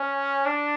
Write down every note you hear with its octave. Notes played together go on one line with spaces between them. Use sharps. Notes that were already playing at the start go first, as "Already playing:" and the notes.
Already playing: C#4
D4